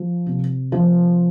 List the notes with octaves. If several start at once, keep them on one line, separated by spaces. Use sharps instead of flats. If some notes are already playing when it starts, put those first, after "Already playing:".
Already playing: F3
C3
F3